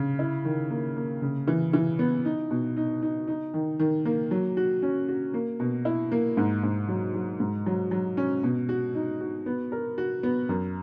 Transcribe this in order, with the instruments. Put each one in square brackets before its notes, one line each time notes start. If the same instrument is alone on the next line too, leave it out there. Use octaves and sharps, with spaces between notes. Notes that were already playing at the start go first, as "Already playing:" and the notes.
Already playing: [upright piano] C#3
E4
D#3
A#3
A#3
C#3
E3
E3
B3
D#4
B2
D#4
D#4
D#4
D#3
D#3
A#3
F#3
F#4
C#4
F#4
A#3
B2
E4
A#3
G#2
G#2
F#3
F#3
G#2
F#3
F#3
C#4
B2
F#4
D#4
F#4
B3
A#4
F#4
B3
F#2